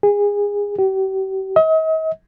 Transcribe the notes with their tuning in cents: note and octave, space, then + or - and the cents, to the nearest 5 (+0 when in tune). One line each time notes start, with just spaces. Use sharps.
G#4 -25
G4 -40
D#5 +40